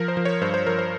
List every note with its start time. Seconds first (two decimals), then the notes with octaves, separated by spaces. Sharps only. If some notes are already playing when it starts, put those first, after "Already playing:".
Already playing: F3 A#4
0.08 C5
0.17 F3
0.25 C#5
0.41 G2 C5
0.54 C5
0.67 F3 A#4
0.79 C5